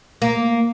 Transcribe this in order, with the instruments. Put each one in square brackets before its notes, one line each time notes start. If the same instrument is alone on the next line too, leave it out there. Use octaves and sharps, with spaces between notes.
[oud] A#3